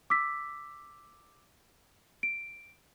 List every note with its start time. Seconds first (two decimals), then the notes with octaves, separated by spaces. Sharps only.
0.10 D6 E6 B6
2.23 D7